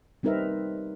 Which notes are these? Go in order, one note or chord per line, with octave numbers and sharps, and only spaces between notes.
G3 C4 D#4 A#4 B4 E5